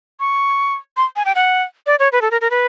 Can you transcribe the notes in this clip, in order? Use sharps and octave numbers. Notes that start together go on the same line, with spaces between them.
C#6
C6
G#5
G5
F#5
D5
C#5
B4
A4
A#4
A#4
B4